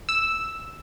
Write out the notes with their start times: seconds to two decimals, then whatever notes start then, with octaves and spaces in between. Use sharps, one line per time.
0.09 E6